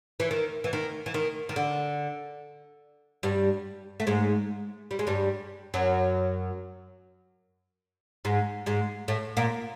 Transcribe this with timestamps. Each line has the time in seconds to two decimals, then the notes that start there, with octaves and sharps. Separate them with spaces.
0.20 E3
0.31 D#3
0.64 E3
0.73 D#3
1.06 E3
1.14 D#3
1.49 D#3
1.56 D3
3.23 G2 G3
4.00 A3
4.07 G#2 G#3
4.91 G3
4.99 G#3
5.07 G2 G3
5.74 F#2 F#3
8.25 G#2 G#3
8.66 G#2 G#3
9.08 A2 A3
9.37 A#2 A#3